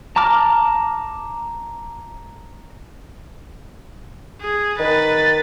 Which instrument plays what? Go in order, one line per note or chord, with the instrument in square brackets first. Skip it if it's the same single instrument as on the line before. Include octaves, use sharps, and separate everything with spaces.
[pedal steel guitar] A5 A#5 D6 F6
[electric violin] G#4
[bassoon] D#3 [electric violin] B4 A6